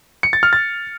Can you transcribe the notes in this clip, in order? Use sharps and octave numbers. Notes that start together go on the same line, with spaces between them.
C#7
A6
F6
A6